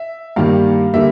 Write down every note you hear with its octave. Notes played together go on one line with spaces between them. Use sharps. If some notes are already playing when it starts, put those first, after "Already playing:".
Already playing: E5
G2 D#3 G3 A#3 F5
D3 G3 A#3 E5